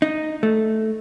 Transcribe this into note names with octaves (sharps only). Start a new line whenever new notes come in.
D#4
A3